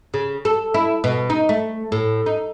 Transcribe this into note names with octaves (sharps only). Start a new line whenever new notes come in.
C#3
A4
E4
B2
D#4
A3
A2
D#4